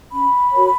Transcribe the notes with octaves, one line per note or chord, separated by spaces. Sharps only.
C#4 B5
F#4 A#4 C#5